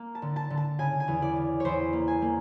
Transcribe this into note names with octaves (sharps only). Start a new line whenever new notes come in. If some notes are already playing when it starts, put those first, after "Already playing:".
Already playing: A#3
A5
D3
A5
D3
A5
C#3 G#5
G#5
E2
D5
C#3
E2 C5 C#5
A#3
G#5
A#3